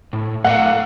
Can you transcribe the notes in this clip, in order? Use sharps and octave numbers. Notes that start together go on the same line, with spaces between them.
A2
A3 D#5 F5 F#5